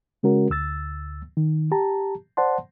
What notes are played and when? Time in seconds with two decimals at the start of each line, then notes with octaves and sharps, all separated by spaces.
0.23 C#3 G#3 C#4 F#4 A#4
0.50 D2 E6 A6
1.37 D#3
1.72 G4 A5 A#5
2.37 C5 D5 F#5 A5 C6